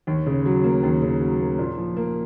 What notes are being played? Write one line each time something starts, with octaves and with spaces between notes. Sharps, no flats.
D#2
C#3
F#3
A#3
D#2
C#3
F#3
A#3
A#2
F3
A#3